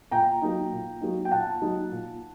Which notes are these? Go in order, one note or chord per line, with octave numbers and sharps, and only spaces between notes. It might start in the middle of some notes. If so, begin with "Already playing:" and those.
A#2 G5 A#5
F#3 A#3 D#4
A#2
F#3 A#3 D#4
G5
A#2 F#5 A5
F#3 A#3 D#4
A#2